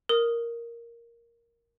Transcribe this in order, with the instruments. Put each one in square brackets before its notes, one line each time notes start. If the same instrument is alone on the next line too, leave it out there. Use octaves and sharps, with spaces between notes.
[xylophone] A#4 D#6